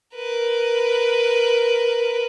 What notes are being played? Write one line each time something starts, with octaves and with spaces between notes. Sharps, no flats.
A#4 B4